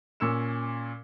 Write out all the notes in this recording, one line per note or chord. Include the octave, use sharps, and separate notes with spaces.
A#2 C#4 E6 C#7 E7